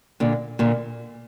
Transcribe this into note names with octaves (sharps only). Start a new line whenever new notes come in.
A#2 D3
A#2 D3